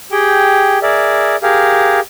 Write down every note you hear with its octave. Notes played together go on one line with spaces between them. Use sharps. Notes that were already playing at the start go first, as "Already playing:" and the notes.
G4 G#4 G5
G#4 A#4 D5 E5
G4 G#4 A#4 F5